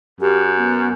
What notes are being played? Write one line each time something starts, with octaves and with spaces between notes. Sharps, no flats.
F#2 G4
B3